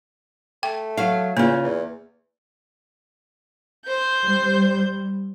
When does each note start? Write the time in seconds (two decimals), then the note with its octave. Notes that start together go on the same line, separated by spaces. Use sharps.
0.63 A3 G5
0.97 F#3 F5
1.37 E2 C#3 A#3 F4
1.64 E2
3.86 C5 G6
4.25 G3